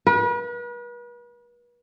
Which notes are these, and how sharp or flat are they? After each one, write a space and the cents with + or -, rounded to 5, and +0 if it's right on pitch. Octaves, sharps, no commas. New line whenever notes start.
B4 -40